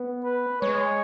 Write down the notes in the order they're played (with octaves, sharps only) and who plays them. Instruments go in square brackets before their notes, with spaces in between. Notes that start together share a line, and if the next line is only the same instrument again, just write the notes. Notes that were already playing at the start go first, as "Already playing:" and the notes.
Already playing: [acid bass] B3
[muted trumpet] B4
[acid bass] G#3 [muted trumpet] C#5